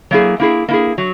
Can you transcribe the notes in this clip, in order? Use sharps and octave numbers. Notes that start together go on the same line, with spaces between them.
F#3 A#3 E4 G#4
A#3 E4 G#4
A#3 E4 G#4
F#3